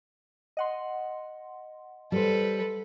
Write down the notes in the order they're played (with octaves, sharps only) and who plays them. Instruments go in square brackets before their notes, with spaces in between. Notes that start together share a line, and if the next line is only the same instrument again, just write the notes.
[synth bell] D#5 F#5 C6
[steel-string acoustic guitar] G3 C5 [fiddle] A4 B4